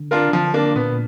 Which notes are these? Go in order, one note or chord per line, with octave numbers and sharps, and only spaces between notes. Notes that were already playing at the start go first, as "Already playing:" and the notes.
Already playing: D3
D4 F4 A#4
D3 F3
A#3 D4
A#2 B3